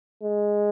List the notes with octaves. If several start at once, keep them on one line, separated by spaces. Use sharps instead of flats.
G#3